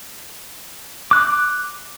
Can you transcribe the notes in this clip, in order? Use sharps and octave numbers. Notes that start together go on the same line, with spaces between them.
D6 F#6